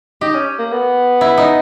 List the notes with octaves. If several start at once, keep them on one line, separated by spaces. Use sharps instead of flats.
D#4 G4
C#4
A#3
B3
E4
D#4